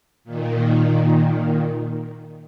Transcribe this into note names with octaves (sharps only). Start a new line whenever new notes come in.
A#2 D#3